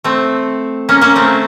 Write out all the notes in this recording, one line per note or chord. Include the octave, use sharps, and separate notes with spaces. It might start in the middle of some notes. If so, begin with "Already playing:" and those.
A3 C4
A#3 C#4
A#3 C#4
A3 C4